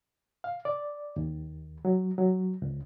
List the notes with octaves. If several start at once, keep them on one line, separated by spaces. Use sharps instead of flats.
F5
D5
D#2
F#3
F#3
C#2